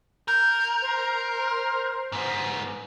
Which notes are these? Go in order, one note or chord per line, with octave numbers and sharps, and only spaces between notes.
A#4 G6
C5
G#2 B3